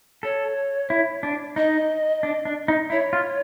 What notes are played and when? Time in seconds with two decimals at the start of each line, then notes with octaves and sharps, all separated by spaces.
0.23 A4 C#5
0.90 E4
1.23 D4
1.56 D#4 D#5
2.23 D4
2.45 D4
2.68 D#4
2.90 E4 C#5
3.13 F4